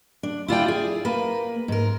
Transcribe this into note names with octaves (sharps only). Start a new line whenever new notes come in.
D4
E4 F4 D5 G5
G#4
A#3 B4
G#2 A#4